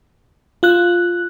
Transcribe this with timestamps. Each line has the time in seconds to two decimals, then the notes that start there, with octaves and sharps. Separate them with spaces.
0.63 F4 F#6